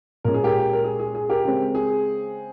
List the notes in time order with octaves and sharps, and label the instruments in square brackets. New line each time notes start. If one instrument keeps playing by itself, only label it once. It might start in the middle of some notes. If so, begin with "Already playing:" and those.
[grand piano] A#2 G#3 C#4 A#4
G#4
G4 A#4
A#4
G#4
G#4
G#4
G4 A#4
C#3 G#3 C4
G#4